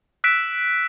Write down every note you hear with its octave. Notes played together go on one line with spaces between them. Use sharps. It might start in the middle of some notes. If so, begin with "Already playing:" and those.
E6 F#6 B6 D7 E7